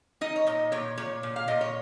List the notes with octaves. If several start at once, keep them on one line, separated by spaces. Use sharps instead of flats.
D#4 D#5
C#5
A#2 D#5
A#2 C#5
A#2 C#5
A#2
F5
A#2 D#5
C#5